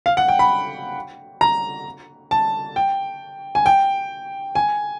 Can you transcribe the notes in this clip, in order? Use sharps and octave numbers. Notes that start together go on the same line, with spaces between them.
F5
F#5
G5
B5
A#5
A5
G5
G#5
G5
G#5